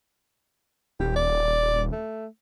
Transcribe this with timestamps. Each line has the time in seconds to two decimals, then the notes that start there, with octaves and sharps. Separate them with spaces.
1.00 D#1 G4
1.16 D5
1.92 A3